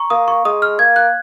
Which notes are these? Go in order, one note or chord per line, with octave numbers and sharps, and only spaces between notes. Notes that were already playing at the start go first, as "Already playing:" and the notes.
Already playing: A#5 C#6
A#3 D#6
C#6
G#3 D#6
F6
A#3 G#6
F#6